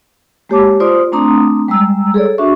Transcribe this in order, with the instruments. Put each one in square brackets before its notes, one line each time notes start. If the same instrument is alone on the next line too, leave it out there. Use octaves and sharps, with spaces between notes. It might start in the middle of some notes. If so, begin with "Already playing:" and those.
[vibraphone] G#3 A#3 G4 C#5 A5 D6
F4 C5 D5 C6 D#6
A3 C4 D4 A#5 C6 D#6
G3 G#3 A#5 E6
G#4 A4 C#5 D5
D4 F#4 E5 C#6